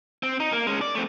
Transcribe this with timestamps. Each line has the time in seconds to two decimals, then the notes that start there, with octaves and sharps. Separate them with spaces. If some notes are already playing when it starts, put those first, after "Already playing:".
0.23 C4
0.40 D#4
0.52 A#3
0.67 G#3 C#4
0.81 D5
0.95 A3 C4